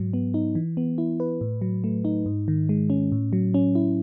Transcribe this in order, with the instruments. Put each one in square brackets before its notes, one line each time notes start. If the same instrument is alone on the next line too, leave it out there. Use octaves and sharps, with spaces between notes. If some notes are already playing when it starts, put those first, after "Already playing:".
Already playing: [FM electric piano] G#2 F#3
B3
D#4
E3
B3
E4
B4
A2
F#3
A3
D#4
G#2
D#3
G#3
C#4
A2
F#3
C#4
E4